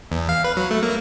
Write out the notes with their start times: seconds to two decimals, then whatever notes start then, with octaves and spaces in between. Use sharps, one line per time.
0.12 E2
0.29 F5
0.44 B4
0.57 F#3
0.71 A3
0.83 A#3